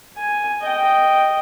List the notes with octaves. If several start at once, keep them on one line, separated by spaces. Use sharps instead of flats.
G#5
D#5 G5